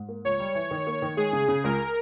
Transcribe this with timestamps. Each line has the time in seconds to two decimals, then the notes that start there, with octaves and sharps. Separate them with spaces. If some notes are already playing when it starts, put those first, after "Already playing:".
Already playing: G#2
0.09 A#3
0.25 C#2 C#5
0.40 G3
0.55 E3
0.71 D#3
0.87 A#3
1.02 D#3
1.17 G#3 G#4
1.33 C#3
1.48 C#3
1.64 C#2 A#4